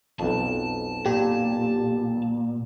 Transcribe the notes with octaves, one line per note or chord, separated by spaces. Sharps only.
B1 F2 A5
A#2 G4